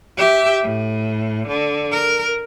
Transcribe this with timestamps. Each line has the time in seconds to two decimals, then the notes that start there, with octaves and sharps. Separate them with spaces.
0.17 G4 E5
0.63 A2
1.47 D3
1.92 A#4